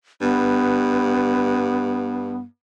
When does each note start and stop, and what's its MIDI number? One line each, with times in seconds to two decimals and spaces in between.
0.21 2.44 43
0.21 2.38 59